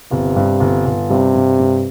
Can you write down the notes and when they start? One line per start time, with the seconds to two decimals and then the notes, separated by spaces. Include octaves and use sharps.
0.11 G1 C3
0.36 G2
0.60 G1
0.86 G1
1.10 G2 C3
1.35 G2
1.59 G2